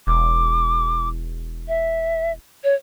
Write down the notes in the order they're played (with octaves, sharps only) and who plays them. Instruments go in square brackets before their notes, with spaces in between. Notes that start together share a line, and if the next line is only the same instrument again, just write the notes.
[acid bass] E1 [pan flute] D6
[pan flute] E5
C#5